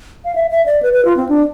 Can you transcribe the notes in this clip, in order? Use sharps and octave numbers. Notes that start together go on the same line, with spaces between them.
F5
E5
E5
D5
B4
B4
F4
C4
D4